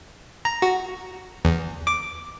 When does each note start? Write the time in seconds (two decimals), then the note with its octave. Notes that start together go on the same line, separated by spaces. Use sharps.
0.45 A#5
0.62 F#4
1.45 E2
1.87 D6